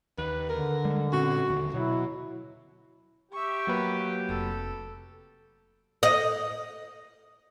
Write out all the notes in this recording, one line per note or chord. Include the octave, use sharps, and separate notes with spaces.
D#2 B4
D3 A#4
G3 G#3
A#2 C4 C#4 F#4
D#1 D3
B2 F#3 E4
G4 E5 C#6
F#3 A#3 B4
F1 A4
D#5